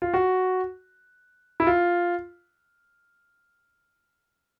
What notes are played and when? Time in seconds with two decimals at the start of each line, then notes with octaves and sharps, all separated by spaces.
0.02 F4
0.14 F#4
1.60 E4
1.67 F4